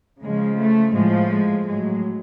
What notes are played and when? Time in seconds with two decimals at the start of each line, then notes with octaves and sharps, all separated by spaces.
0.22 C#3 F3 G#3
0.57 A3
0.93 A2 F3 G#3
1.30 G#3
1.65 A2 F#3 G#3